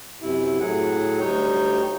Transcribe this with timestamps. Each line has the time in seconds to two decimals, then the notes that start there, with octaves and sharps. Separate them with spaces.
0.22 F#2 C3 E4
0.60 A2 F#3 G#4 F#5
1.20 D2 G3 D#4 C#5 G5